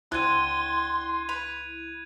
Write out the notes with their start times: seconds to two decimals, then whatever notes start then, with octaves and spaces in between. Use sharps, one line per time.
0.12 C#2 D3 C4 E4 C6 F#6 G#6 D#7
1.29 B4 F7